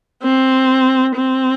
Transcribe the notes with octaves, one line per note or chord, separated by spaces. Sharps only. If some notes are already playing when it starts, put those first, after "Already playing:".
C4
C4